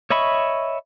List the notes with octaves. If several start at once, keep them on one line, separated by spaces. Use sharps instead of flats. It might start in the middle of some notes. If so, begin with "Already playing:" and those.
C#5 D#5 E5 B5 C#6